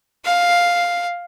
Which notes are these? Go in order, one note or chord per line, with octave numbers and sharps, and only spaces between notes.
F5